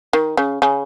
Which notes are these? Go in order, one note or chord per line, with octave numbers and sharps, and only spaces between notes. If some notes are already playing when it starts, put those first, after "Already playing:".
D#3
C#3
C#3